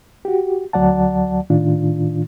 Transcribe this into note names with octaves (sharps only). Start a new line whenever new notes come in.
F#4 G4
D2 F#3 D5 F#5 A5
A2 D#3 D4 F4